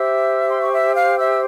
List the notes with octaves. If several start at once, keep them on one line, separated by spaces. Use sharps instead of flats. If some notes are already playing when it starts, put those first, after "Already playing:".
Already playing: G4 C5 E5 E6
C6
C#6
E5 E6
F5 F6
E5 E6